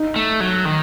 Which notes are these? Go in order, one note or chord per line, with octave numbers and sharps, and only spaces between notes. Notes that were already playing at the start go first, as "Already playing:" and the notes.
Already playing: D#4
A3
F#3
D#3